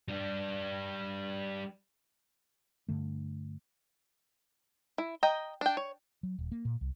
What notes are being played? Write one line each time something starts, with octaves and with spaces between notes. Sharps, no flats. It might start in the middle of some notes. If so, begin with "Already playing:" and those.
G3 D4
G2 D3 A3
E4
D#5 G5 A#5
D4 G5
C#5
F#3
D#1
A#3
A#2
C2